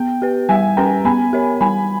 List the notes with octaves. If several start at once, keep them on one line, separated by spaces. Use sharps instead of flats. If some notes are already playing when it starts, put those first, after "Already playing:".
Already playing: B3 G5
G4 B4
G3 E5 G#5
C#4 G4 B4 G5 A#5
B3 G#5 B5
G4 A#4 C#5
G3 G#5 B5